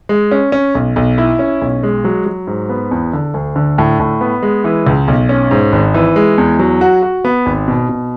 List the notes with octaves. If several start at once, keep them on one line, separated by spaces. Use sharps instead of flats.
G#3
C#4
C#4
B1
B1
E4
C#4
B1
G#3
F#3
F#3
G#2
B3
E2
D3
D2
D3
A2
A2
B3
G#3
E3
C#2
B1
C#4
G#2
G#1
E3
G#3
E2
F#3
F#4
F#4
B3
G#1
B2
B2